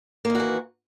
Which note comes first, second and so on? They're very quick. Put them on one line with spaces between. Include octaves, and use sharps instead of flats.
A#3 D#3 F#4 E3